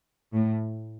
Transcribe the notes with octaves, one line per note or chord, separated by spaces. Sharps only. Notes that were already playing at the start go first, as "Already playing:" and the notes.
A2